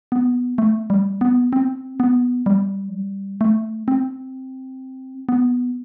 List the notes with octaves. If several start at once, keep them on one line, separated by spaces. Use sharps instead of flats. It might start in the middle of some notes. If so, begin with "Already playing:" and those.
B3
A3
G3
B3
C4
B3
G3
F#3
G3
A3
C4
B3